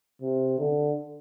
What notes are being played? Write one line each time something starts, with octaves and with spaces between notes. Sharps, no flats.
C3
D3